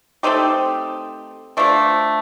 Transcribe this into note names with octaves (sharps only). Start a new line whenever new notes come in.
A3 C4 D#4 G4
F3 A3 D4